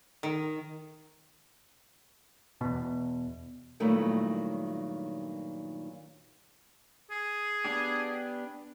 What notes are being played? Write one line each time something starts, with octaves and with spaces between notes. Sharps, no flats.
D#3
E2 B2
G2 A#2 D#3 F#3 A3 E4
G#4
B3 D4 G4